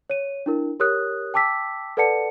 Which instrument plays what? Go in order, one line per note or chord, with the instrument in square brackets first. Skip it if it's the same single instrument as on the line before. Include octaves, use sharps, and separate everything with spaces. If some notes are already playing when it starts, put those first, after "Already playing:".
[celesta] C#5 D#7
D4 E4 A#4
G4 A#4 C#5 D#6 F#6
G5 A5 D6 E6 B6
A4 B4 D5 F#5 A5 C#7